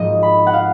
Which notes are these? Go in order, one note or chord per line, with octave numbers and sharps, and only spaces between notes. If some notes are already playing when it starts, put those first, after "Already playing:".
Already playing: G#1 G#2 F3 D#5
B5
F#5
F5